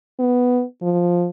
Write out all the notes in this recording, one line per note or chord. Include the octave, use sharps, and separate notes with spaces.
B3
F3